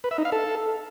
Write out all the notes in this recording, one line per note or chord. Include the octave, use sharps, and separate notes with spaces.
B4
E5
D#4
F5
A4